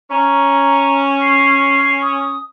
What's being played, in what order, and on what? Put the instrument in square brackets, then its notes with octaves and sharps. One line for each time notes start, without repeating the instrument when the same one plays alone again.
[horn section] C#4 [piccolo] A#5
[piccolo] C7
D#6